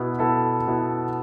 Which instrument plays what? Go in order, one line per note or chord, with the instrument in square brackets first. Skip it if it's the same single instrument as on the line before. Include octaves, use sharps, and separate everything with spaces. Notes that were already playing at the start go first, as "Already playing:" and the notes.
Already playing: [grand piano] B2 B3 E4
B2 B3 E4 A4
B2 B3 E4